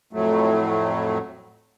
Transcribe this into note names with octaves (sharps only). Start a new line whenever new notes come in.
F2 A2 F#3 A3